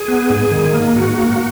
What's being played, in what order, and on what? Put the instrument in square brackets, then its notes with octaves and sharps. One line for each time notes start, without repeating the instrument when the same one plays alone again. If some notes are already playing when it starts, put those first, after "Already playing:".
Already playing: [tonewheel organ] G#4
B3
G#2
D#3
A#3
G#2 F#4
A#3